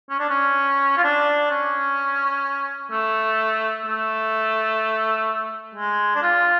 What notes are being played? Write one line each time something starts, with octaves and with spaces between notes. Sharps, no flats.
C#4
D4
C#4
F4
D4
C#4
A3
A3
G#3
D4
F4